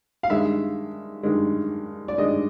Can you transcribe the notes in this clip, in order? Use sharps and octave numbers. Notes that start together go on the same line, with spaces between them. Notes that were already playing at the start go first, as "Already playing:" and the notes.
F5
G2 D#3 G#3 E5
G2 D#3 G#3
D5
G2 D#3 G#3 D#5